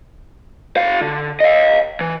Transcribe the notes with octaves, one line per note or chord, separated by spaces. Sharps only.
F#4 F5
D3
D#5 F5
E3